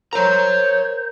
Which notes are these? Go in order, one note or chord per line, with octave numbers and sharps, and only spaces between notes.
A#4 C5 C#5 A#5